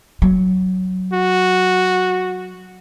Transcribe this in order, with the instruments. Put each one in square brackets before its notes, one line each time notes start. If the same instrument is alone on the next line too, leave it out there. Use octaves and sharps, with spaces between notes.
[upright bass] F#3
[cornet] F#4